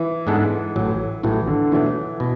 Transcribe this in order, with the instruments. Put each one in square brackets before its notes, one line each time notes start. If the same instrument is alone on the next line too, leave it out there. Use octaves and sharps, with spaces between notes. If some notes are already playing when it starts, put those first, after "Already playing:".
Already playing: [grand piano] E3
[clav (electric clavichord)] G#2 G#3 B3 D4 A4
A1 A2 F#3
[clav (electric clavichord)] A1 A2 F#3 [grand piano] E3
[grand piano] D3
[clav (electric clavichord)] B2 F#3 A3 D4 [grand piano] E3
[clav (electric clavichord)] B2